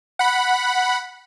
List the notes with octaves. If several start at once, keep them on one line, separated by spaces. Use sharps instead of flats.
F#5 B5